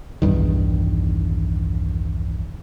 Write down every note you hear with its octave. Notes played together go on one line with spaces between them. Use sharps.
B1 E2 G2 D#3